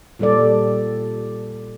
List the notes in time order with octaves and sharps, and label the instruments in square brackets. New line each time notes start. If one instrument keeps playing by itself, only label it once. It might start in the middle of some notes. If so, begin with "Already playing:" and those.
[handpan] A#2 G3 A4 D5